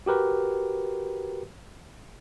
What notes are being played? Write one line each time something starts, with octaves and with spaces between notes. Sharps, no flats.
F#4 G4 A#4 B4